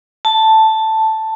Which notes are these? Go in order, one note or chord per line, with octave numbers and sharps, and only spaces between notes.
A5